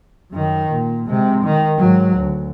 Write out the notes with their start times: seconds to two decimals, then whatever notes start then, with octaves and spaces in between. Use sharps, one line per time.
0.32 F#2 D#3
0.71 A#2
1.07 C3 G#3
1.44 D#3
1.78 G#2 F#3
2.17 D2